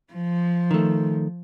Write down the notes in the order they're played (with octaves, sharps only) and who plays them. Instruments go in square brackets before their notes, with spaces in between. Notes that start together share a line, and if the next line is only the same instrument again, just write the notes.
[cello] F3
[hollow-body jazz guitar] D#3 A3